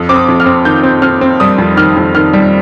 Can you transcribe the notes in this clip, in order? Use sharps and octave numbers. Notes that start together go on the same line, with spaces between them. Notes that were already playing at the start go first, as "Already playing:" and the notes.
Already playing: F2 D#6
C4 D6
D#6
F2
F6
C4
D#3 G6
C4
C4 F6
C4
G3 D#6
F2
D#3 F6
F2
D#3 F6
G3